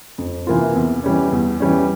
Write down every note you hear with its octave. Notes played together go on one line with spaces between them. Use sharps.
F2
C3 E3 A#3 F4
E2
E3 G3 C#4
E2
E3 G3 C#4